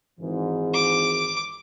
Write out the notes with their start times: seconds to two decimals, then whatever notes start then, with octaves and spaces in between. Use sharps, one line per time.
0.20 G#1 G#2 E3
0.74 D6